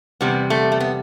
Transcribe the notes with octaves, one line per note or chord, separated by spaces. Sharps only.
E2 C3 G3 B3
A3
A3
B3